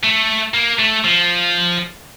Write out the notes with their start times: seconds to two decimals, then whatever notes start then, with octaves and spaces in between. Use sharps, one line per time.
0.04 A3
0.54 A#3
0.79 A3
1.04 F3